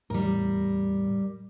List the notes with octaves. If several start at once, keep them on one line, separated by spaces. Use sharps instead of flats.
E2 A2 G3 A#4